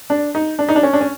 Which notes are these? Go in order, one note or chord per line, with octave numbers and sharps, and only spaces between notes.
D4
D#4
D4
D#4
D4
C#4
D4
C#4